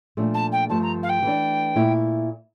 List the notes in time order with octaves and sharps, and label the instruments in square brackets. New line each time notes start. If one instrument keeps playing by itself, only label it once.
[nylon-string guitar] A#2 F3 A3 D4
[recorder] A5
G5
[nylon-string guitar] G2 F3 A3 [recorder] A5
[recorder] A#5
F5
G5
[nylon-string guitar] E3 A3 D4
A#2 A3 E4